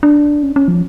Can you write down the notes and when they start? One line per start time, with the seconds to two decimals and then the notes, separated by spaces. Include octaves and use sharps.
0.03 D4
0.43 C#4
0.56 C#4
0.68 F3